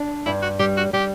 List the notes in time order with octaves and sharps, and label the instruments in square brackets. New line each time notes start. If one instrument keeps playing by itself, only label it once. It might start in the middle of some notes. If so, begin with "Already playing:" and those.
Already playing: [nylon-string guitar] D4
[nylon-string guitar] G2 [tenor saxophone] E4
[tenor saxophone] F#4
[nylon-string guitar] G3 [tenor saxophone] G4
[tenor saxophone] F#4
[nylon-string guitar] G3 [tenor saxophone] G4